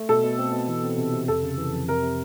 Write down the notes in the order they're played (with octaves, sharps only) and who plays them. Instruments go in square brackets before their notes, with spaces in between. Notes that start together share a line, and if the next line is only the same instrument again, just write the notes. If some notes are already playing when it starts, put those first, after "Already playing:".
Already playing: [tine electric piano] A3
[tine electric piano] B2 [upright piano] A4
[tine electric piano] B2
C4
B2
E3
C4
C3
C3
[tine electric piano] F2 [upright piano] A4
[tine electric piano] C#3
E3
F2
[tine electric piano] C3 [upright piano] A#4
[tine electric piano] C3